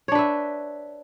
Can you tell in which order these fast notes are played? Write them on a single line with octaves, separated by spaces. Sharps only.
C#5 D4 B4 E5